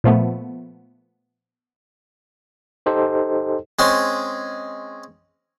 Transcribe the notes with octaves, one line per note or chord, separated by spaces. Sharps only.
A#2 F3 A3 B3
D#4 G4 A4 C5 D#5
G#3 C4 C#4